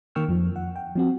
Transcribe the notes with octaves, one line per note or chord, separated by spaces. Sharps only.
D#3 A#3 G5 C#6 E6 F6
F2 F3
F#5
G5
F3 C4 F#4